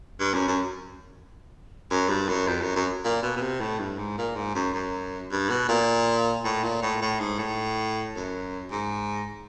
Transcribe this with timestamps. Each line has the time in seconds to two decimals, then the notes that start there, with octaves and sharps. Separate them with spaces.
0.20 G2
0.34 F#2
0.48 F#2
1.90 F#2
2.09 G2
2.28 F#2
2.47 F2
2.61 F#2
2.76 F#2
3.04 A#2
3.22 B2
3.36 B2
3.41 C3
3.60 A2
3.79 G2
3.98 G#2
4.18 A#2
4.36 G#2
4.55 F#2
4.74 F#2
5.31 G2
5.49 B2
5.68 A#2
6.44 A2
6.63 A#2
6.82 A2
7.01 A2
7.20 G#2
7.39 A2
8.15 F#2
8.71 G#2